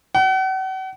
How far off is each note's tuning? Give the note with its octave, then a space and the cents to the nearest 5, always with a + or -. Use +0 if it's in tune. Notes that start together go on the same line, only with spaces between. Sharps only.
F#5 +40